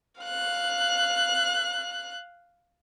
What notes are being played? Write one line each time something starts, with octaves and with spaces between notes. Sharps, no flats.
F5 F#6